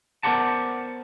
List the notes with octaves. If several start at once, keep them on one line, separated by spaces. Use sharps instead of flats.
B3 A#4 C5 D5 F#5 A5